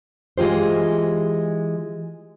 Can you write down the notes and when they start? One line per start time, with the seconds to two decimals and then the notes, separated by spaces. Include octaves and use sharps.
0.38 E3 G#3 F4 G4 C5